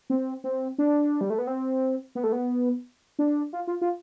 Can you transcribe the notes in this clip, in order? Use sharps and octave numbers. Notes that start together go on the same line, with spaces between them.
C4
C4
D4
G3
A3
B3
C4
B3
A3
B3
D4
F4
F4
F4